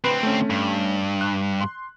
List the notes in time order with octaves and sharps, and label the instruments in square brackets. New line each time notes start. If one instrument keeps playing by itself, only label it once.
[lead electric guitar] D2 C4 [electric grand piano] B4
[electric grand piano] A3 C#4
[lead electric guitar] G2
[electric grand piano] F#6
C6